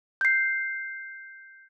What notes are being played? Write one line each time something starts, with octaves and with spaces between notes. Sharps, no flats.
G6 C7